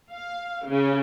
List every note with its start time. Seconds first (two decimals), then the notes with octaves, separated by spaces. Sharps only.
0.13 F5
0.68 C#3